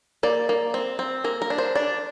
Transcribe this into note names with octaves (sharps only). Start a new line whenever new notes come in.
A#3 D5
A#3
C4
C4
A#3 A#4
A#4
D4
C5
D4 D5